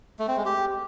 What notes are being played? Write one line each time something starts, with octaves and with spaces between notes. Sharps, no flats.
A3
C4
G#3
G4